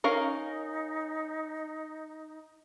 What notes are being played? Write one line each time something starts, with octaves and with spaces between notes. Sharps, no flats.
C#4 D#4 A#4 F5